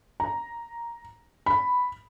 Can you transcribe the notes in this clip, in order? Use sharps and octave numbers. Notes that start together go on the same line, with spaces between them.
A#5
B5